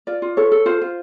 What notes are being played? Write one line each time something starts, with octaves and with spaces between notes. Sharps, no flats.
F4 D5
F4
A4 C#5
A4
F4 C5
F4